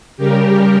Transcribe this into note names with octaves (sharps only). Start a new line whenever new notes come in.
C#3 G3 G4 A#4